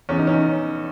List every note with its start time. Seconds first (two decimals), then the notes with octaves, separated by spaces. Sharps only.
0.09 E2 C#4
0.19 D#4
0.27 C#4